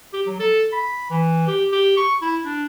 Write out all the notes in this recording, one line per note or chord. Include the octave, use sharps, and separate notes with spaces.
G4
F#3
A4
B5
E3
G4
G4
C#6
E4
D4